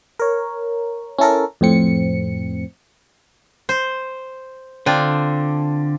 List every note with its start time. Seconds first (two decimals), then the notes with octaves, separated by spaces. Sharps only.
0.19 A#4 C#5
1.18 C#4 E4 A4 A#4
1.61 F2 A2 C4 C#7
3.69 C5
4.86 D3 C4 D4 F4